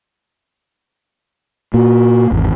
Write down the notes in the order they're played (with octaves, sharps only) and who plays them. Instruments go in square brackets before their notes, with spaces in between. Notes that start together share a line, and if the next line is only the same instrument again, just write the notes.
[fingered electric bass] A#2 A#3 [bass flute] F#4
[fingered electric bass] G#1 E2